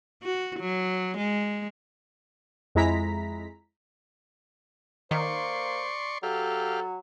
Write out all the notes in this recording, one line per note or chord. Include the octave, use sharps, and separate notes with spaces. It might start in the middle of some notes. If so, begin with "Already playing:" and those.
F#4
F#3
G#3
F2 G#3 E4 A#5 B6
D#3 A#3 C5 D5 C6 C#6
F#3 G4 A4 F5